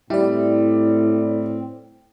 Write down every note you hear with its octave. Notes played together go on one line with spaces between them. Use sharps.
A2 G3 C4 E4 D5